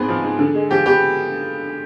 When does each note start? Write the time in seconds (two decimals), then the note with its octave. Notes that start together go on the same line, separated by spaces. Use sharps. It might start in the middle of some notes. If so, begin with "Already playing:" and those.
Already playing: G#2 B3 C4 G#4
0.09 F3
0.23 G#2
0.39 D3
0.55 G#3
0.70 F3 G4
0.86 B3 G4